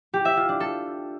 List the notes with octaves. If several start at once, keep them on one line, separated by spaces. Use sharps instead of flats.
G4
E5
F4
D4
A4